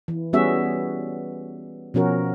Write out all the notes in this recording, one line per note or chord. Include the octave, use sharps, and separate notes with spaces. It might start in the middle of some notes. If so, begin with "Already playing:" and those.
E3
G3 B3 C#4 F#4 G#4 E5
B2 F3 C#4 F#4 A#4